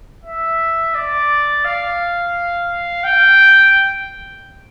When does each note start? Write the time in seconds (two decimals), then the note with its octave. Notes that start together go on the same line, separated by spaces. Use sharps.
0.24 E5
0.94 D5
1.65 F5
3.04 G5